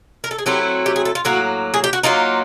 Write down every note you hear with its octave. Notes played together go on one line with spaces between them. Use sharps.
A#4
A4
G#4
F#3 A3 C4 E4 G4
G4
G#4
A4
F4
A2 F#3 A#3 F#4
G#4
G4
F#4
F#3 A#3 D#4 F4